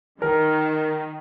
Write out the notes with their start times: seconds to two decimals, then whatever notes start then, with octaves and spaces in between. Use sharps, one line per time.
0.22 D#3 A#4